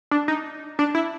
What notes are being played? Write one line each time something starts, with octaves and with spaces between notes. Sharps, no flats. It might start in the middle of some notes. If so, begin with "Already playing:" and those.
D4
D#4
D4
E4